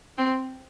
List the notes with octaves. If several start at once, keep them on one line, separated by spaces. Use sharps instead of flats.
C4